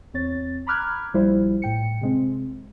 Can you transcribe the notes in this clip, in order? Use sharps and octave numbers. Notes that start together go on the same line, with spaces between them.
E2 C4 C#5 A6
A#5 B5 D6 F6 F#6 G#6
A#1 F3 G3 E4 C5
A2 G5 C#7
C3 G#3 C4